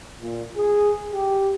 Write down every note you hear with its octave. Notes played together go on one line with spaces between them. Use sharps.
A#2
G#4
G4